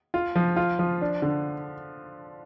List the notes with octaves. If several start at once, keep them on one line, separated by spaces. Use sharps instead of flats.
F4
F3
F4
F3
D4
D3